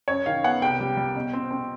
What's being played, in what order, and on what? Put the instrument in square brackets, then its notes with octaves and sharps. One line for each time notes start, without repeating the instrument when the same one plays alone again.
[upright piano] F#2 C#5
D#3 F5
B3 F#5
C2 G5
G3
G3
B2
C4
C4